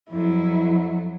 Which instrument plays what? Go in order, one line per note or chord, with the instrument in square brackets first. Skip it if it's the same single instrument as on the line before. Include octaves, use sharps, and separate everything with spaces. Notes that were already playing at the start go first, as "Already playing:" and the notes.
[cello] F2 F#3 [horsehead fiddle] E4